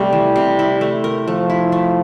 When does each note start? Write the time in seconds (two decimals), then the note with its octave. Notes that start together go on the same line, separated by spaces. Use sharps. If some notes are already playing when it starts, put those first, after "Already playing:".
Already playing: C3 G3 A3
0.13 E3
0.36 C3
0.59 E4
0.81 A3
1.04 A#4
1.27 F3 A3
1.50 E4
1.72 A3